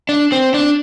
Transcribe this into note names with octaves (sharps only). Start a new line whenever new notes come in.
D4
C4
D4